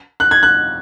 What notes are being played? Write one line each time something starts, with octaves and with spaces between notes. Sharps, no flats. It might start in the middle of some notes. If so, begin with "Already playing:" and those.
F#6
G#6
F#6